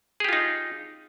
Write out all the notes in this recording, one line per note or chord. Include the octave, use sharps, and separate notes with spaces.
D#4 F4 G4 G#4